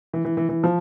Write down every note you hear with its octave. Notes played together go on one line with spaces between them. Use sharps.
E3
E3
E3
E3
F3